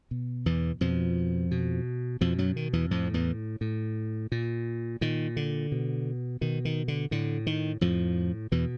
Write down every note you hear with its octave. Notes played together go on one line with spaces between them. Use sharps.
B2
E2 E3
F2 B2 F3
B2
F2 B2 F3
F#2 F#3
D#3
E2 E3
F2 A2 F3
E2 E3
A2
A#2
A#2 D#3
D3
B2
B2 D#3
D#3
D3
A2 D3
D#3
F2 A2 F3
E2 B2 E3